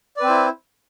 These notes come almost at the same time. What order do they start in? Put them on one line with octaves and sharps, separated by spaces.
D5 B4 C4 C5 E4